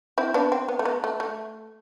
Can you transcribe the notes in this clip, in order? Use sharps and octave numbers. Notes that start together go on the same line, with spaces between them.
C4 E4
B3 D4
C4
B3
A3
B3
A3
A3